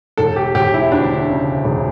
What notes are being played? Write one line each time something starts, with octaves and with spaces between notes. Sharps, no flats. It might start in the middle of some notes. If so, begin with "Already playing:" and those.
E1 A4
G4
E1 G4
E4
D2 D4
C#3
E1